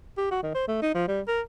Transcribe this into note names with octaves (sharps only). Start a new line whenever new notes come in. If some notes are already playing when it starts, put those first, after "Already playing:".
G4
F#4
D#3
C5
A3
D#4
F3
G3
A#4